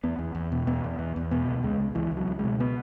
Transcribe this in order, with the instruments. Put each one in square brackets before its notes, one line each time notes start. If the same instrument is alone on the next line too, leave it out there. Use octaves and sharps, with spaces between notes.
[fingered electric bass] E2 B3
E2
E2
B2
E2 B3
E2
E2
E2
B2 B3
C#2
C#2 G#3
C#2
C#2 E3
C#2
F#3
C#2
G#3
B2
B3